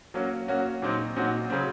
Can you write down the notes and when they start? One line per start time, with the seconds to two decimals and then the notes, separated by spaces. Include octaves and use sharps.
0.14 F#3 A#3 C#4 F#4
0.48 F#3 A#3 C#4 F#4
0.82 A#2 F#3 C4 D#4 F#4
1.16 A#2 F#3 C4 D#4 F#4
1.50 C#3 F#3 C4